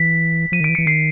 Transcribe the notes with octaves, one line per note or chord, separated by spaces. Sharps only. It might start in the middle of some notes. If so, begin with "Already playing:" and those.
Already playing: E3 B6
F3 D#7
D#3
E3 D7
E3 C#7
D#3 C7